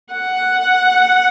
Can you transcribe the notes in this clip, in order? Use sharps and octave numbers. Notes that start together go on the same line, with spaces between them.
F#5